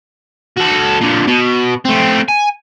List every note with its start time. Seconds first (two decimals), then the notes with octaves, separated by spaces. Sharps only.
0.57 F#4 A4
1.01 A#2 D3
1.27 B2
1.85 A3 C4
2.28 G#5